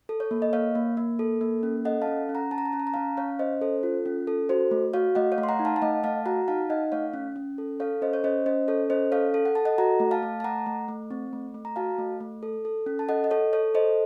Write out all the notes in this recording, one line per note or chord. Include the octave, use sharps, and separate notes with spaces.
A4
C#5
A#3
D#5
A#3 C#5 F5
A#3
A#3
A4
A#3
C#4
A4 D#5 F#5
F5 A5
C#4
C#4
F#5 A#5
C#4 A5
A#5
A5
C#4 A#5
A5
A#5
C#4 F5 A5
C#4 C#5 F5
C#4 C5 D#5
A4 C5
F4
C#4
A4
F#4 C5
A3
F#4 C#5 F5
A3 D#5 F#5
C#5 F5
A3
C6
F#5 A#5
D#4
F5 A5
A5
A3 D#5 F#5
A3 F5 A5
F#4 F#5 A#5
D#4 F5 A5
D#4 D#5 F#5
A3 C#5 F5
C#4
C#4
A4
A4 C#5 F5
C#4 C5 D#5
C#5
C#4 C5 D#5
C#4 C5 D#5
A4 C#5
C#4 C5 D#5
A4 C#5 F5
A4
F#5
A4 A5
D#5 F#5
F#4 F#5 A#5
A3
F5 A5
A3
A5
A3 F#5 A#5
A3
A3
C4
A3
A3
A#5
F#4 F5 A5
A3
A3
A4
A4
C#4
A5
A4 D#5 F#5
D#5
A4 C#5
A4 C#5
A4 C5 D#5